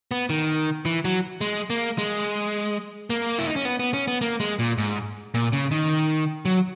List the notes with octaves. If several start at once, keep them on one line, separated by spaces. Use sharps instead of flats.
B3
D#3
E3
F#3
G#3
A#3
G#3
A#3
E4
D#4
C#4
B3
B3
C#4
B3
A#3
G#3
A#2
G#2
A#2
C#3
D#3
F#3